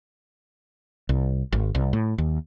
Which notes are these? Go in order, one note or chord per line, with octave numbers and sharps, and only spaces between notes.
C2
G#1
C2
A2
D#2